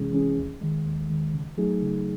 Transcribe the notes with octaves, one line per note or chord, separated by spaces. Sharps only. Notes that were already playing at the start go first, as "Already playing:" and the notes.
Already playing: C3 E3 G#3 C#4 G#4
E3 G#3 C#4 G#4
D#2
D#3 G#3
D#2
D#3 G#3
C#3
F#3 A3 D#4 G#4
C#3